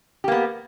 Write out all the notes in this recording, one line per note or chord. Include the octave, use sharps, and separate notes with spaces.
A#3 B3 G4